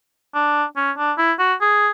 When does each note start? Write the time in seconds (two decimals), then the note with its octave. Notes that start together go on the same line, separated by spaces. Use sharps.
0.35 D4
0.76 C#4
0.98 D4
1.18 E4
1.39 F#4
1.61 G#4